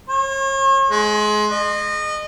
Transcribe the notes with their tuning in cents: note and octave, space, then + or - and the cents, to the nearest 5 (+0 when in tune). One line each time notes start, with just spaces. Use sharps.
C#5 -40
G#3 +25
D#5 -30